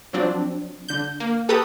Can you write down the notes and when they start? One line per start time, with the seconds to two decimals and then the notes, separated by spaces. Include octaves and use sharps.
0.13 F3 F#3 C4 D4
0.89 D3 G6
1.20 A#3
1.49 G4 A4 B4 A#5 C#6 D#6